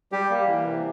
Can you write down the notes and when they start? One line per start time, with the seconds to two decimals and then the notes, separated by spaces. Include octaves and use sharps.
0.12 G3 G4
0.30 A#3
0.47 E3
0.66 C3